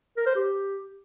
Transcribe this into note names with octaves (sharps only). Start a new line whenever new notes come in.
A#4
C5
G4